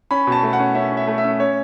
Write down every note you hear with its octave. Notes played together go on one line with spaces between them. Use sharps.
C#4 B5
B2 A5
A3
F#5
C#4
C#4 E5
C#4
E5
A3
E5
C#4
C#4 C#5